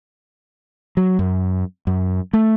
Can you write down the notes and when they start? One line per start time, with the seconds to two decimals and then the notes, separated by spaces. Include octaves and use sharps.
0.97 F#3
1.19 F#2
1.87 F#2
2.33 A3